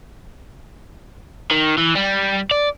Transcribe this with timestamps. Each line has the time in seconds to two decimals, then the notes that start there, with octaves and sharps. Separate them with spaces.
1.51 D#3
1.78 E3
1.96 G3
2.51 D5